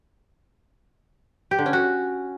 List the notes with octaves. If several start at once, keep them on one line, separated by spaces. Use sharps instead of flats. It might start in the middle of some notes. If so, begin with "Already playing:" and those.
G4
D3
C#4
F#4